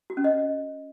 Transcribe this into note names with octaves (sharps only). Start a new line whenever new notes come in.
F#4
C#4
D#5